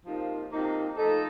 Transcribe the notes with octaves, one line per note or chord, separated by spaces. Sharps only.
C3 F3 A#3 D#4
C3 F3 A#3 D#4
F3 A3 D#4 A4